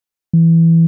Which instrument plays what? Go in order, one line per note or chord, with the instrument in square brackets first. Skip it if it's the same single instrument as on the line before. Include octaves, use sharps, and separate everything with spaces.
[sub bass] E3